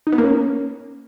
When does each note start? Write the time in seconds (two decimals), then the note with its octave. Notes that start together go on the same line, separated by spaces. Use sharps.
0.07 D#4
0.12 B3
0.18 A#3
0.24 C#4